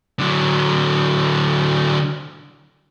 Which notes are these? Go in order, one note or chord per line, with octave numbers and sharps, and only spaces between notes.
D3 F#3